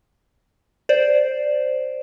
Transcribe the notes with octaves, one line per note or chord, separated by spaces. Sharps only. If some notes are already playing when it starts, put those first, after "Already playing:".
C5 D5